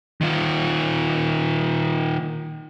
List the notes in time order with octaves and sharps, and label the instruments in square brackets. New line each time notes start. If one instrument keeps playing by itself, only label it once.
[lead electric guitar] D#3 F4